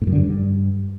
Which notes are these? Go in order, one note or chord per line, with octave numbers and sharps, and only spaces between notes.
A2
F#2
D3
G2